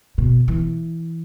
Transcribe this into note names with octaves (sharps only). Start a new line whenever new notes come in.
B2
E3